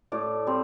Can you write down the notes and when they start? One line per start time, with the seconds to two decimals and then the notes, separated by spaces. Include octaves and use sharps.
0.12 A2 D5
0.47 G3 C4